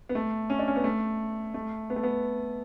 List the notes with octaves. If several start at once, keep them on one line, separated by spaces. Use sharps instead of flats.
B3
A3
C#4
D4
C#4
B3
A3
A3
B3
A3
B3